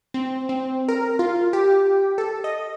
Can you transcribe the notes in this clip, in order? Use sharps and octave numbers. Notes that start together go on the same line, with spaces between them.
C4
C4
A#4
F4
G4
A4
D#5